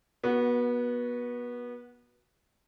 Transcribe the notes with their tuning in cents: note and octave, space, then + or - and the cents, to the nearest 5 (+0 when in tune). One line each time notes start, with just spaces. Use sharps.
B3 -25 F#4 +0